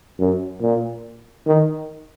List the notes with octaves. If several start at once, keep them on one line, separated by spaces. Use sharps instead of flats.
F#2
A#2
D#3